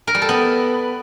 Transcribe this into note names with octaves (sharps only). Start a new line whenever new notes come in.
A#4
G3
A4
B3